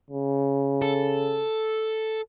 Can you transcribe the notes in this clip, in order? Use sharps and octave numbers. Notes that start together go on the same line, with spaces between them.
C#3
A4